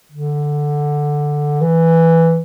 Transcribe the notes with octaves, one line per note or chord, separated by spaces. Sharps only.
D3
E3